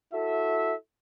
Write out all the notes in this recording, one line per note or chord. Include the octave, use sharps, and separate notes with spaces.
E4 F#4 A4 E5